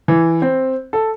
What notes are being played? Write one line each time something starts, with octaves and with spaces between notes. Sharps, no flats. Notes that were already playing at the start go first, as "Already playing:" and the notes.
E3
C4
A4